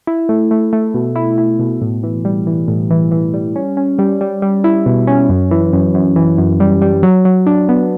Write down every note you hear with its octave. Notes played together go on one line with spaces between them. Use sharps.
E4
A3
A3
A3
B2
E4
E4
B2
A2
E3
G3
E3
A2
E3
E3
G3
C#4
C#4
G3
G3
G3
E4
B2
C#4
F#2
E3
F#2
F#2
E3
F#2
G3
G3
F#3
F#3
D4
B3